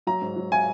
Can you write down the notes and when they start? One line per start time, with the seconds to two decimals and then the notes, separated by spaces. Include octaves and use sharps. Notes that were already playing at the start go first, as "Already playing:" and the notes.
0.07 F#3 A#5
0.21 G#2
0.36 F#3
0.52 G#5